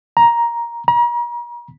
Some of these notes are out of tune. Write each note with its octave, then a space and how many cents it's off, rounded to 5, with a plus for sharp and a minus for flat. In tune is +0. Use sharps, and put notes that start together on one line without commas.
A#5 +10
A#5 +40